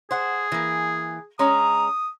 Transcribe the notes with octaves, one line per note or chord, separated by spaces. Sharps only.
G#4 C5 F#5
E3 A#3
G#3 C#4 A#5 D#6